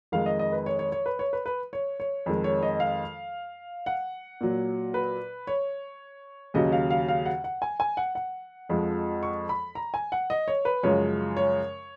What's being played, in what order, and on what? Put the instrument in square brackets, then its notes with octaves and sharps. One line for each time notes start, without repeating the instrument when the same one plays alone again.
[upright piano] F2 D#3 G#3 F5
D#5
D#5
B4
C#5
C#5
C#5
B4
C#5
B4
B4
C#5
C#5
F2 D#3 G#3
C#5
D#5
F5
F#5
A#2 F#3
B4
C#5
D#2 C#3 F#3 D#5
F5
F5
F5
F#5
F#5
G#5
G#5
F#5
F#5
F2 F3 G#3
C#6
B5
A#5
G#5
F#5
D#5
C#5
B4
F#2 C#3 F3 G#3 C#5
C#5